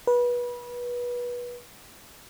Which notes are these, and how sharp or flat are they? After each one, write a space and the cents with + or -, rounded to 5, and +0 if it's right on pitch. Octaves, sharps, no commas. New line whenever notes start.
B4 -25